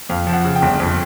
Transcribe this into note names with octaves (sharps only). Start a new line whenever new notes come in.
F2 F5
F3
F#5
C#3
G5
G1
F2